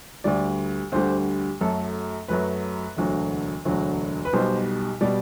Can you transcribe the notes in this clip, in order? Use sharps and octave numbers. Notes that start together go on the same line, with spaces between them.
D2 D3 G3 D5
D2 D3 G3 C5
F#2 F#3 A3 A4
F#2 F#3 A3 B4
E1 D2 D3 F#3
E1 D2 D3 F#3
B4
B1 B2 G3 C5
B2 G3 D5